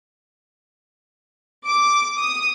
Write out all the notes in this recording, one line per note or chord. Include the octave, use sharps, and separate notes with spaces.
D6
D#6